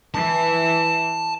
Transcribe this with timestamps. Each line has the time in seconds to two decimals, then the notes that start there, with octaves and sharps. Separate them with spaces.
0.14 E3 A5